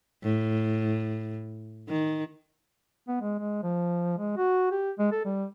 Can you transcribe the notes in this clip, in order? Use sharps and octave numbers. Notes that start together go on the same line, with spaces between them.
A2
D#3
B3
G#3
G#3
F3
G#3
F#4
G4
G#3
A4
G3